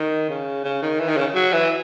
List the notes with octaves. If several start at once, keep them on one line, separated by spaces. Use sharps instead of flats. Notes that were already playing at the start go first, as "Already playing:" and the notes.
Already playing: D#3
C#3
C#3
D#3
E3
D#3
C#3
F#3
E3